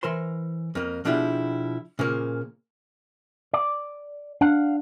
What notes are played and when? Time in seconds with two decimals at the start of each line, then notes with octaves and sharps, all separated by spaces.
0.03 E3 A#4 C5 C6
0.75 F2 A#3
1.05 B2 F3 D4 E4 G4 G#4
1.99 A#2 C#3 F3 A#3
3.53 D5
4.41 D4 F5 F#5